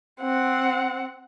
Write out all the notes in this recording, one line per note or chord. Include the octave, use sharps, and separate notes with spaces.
C4 F#5